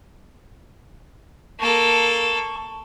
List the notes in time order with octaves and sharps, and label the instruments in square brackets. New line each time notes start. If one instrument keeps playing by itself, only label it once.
[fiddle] A#3 A4 [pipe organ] A5 C#6